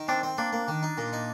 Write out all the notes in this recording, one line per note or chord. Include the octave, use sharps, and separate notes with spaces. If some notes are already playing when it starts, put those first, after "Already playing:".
Already playing: D#3
C4 D4
C4
A#3 D4
A#3
D#3
D#4
A#2
D#4